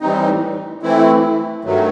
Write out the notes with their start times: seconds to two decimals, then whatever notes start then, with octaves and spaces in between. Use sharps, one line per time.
0.01 A2 E3 G3 C4 D#4
0.82 E3 A3 C4 E4
1.65 G2 D#3 F#3 A3